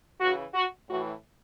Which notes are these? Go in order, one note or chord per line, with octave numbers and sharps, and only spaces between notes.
C#3 E3 F#4
F#4
A2 E3 F#4